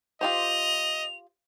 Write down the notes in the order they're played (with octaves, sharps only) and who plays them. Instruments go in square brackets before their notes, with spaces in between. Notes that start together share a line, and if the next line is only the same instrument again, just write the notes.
[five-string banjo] F4 G4 C5 [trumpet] D#5 [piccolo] F7